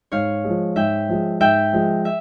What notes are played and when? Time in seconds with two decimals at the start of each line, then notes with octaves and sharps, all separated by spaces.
0.12 G#2 C#5 F5
0.44 F3 G#3
0.76 G#2 E5 G5
1.09 F3 G#3
1.40 G#2 E5 G5
1.73 F3 G#3
2.05 E5